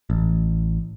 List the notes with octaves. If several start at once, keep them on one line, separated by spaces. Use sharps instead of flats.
A1